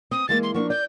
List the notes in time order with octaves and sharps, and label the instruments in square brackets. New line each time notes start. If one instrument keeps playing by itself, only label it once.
[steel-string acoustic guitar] C4 [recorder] D#6
[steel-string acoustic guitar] E3 G#3 A#3 [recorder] A6
[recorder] C6
[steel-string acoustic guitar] F3 A#3 D4 [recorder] C#6
[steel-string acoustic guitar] D5 [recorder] G6